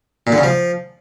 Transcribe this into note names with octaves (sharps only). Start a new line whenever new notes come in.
A#2
D3
C#3
F3